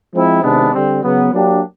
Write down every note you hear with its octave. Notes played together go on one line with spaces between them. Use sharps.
F3 G#3 C4 E4
C3 D#3 G#3 B3 D4
D3 G3 C4
C#3 F#3 B3
F#3 A#3 D4 G4